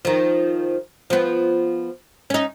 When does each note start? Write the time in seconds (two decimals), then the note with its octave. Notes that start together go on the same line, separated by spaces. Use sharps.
0.05 D#3 F3
1.10 F3 B3
2.30 C#4 D#4